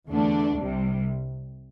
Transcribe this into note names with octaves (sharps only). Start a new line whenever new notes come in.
E2 D3 A3 D4
C2 C3 G3